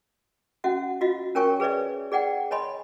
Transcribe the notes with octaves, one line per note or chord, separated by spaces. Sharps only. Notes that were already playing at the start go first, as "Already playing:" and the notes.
C#4 F#4 E5 F#5
F4 F#4 D#5 F5
C#4 A#4 C#5 G5 G#5 C#6
G#4 B4 C#5 D5 E5
G#4 D5 F#5 G5
C#5 D#5 G#5 B5 C6